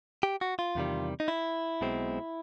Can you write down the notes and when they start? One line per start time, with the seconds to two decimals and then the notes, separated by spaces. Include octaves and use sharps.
0.23 G4
0.41 F#4
0.59 F4
0.75 E2 C3 D#3 G3
1.20 D#4
1.28 E4
1.81 B1 B2 G#3 C4